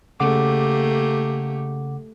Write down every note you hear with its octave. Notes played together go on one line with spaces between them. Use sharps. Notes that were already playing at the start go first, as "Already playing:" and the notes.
C#3 A3 A#3 G4 F#5 D6